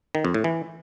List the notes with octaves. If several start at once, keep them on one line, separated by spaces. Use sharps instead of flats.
D#3
F2
A2
E3